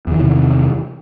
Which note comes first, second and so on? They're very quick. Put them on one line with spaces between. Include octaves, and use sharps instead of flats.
E2 D#3 E3 C3